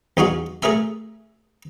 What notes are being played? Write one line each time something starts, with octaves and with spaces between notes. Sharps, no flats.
E2 D#4 F4 F#4 G#4
A3 G#4 A#4 E5 G#5